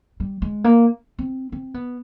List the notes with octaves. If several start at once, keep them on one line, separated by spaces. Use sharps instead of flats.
G3
G#3
A#3
C4
C4
B3